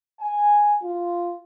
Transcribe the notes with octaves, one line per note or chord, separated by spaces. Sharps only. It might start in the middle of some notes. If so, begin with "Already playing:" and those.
G#5
F4